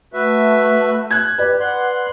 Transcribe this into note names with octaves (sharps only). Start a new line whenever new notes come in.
A3 F#4 B4 E5
F#6 G#6
G4 B4 D5
F#5 C6 F#6